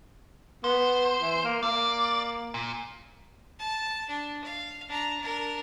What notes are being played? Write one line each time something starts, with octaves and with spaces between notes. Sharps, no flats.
B3 C5
E3
A#3
A#3 D5
A#2
A5
D4
F5
D4 A#5
D4 A#4